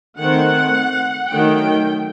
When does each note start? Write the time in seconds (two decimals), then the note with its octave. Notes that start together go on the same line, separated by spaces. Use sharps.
0.19 D#3 A3 C4 F#5
1.30 D#3 F#3 A3 G5